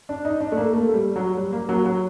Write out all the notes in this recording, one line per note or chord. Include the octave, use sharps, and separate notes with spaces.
D4
D#4
D4
A3
A#3
A3
A3
G3
F#3
G3
A#3
F#3
F#3